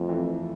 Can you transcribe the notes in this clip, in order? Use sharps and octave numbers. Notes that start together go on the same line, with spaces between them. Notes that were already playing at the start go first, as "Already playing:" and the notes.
Already playing: F2 F3 A3
E3
F3